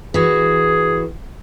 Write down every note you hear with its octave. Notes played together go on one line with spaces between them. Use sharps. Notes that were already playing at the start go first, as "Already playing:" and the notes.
E3 F#4 G#4